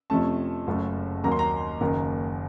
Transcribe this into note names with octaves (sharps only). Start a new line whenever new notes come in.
F2 C3 F3 A3 C#4 A5
F#1 F#2 C#3 A3 C#4
D#2 D#3 F#3 A#3 A#5
C6
A#5
F#1 F#2 D#3 A#3